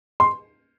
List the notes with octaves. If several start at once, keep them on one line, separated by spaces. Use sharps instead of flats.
C6